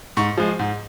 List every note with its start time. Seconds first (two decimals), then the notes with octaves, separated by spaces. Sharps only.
0.17 G#2 C#6
0.38 F3 G#3
0.59 G#2